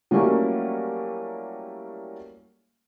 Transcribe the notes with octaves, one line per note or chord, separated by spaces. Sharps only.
F#3 G3 A3 A#3 C#4 E4